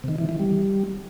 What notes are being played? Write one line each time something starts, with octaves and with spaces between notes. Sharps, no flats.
C3
D#3
E3
E3
G3